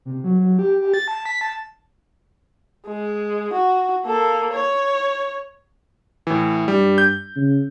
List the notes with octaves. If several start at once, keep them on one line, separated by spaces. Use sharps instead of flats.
C3
F#3
F#3
G4
G4
A6
A5
B6
A5
G#3
F#4
A#3 A4
C#5
A2 E3
G2 G3
G6
C#3